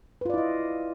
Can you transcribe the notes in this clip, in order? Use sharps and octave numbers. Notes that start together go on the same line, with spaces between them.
E4 F4 B4 D5 D#5